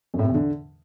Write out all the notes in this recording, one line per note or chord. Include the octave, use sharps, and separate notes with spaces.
F#2
A2
C3
E2
D3